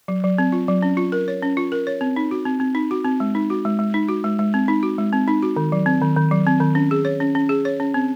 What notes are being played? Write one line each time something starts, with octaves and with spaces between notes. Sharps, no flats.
F#3
F#3
C4
F4
F#3
C#4
F4
A#4
C#5
C#4
F4
A#4
C#5
C4
D#4
F#4
C4
C4
D#4
F#4
C4
G#3
D#4
F#4
G#3
G#3
D#4
F#4
G#3
G#3
C4
D#4
F#4
G#3
C4
D#4
F#4
D#3
F#3
C4
D#3
D#3
F#3
C4
D#3
C#4
G#4
C#5
C#4
C#4
G#4
C#5
C#4
C4